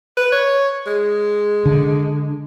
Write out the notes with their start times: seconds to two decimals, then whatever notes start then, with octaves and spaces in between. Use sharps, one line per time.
0.17 B4
0.32 C#5
0.86 G#3
1.66 D3